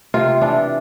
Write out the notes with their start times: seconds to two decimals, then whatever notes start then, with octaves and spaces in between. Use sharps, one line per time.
0.14 C3 F4
0.41 E3 D4